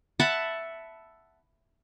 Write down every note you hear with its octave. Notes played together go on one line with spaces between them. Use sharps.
E5 F#5 A5 B5